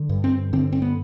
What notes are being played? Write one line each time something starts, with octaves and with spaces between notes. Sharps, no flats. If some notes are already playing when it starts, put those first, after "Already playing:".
Already playing: D3
G2
C4
D3 C4
C4
B3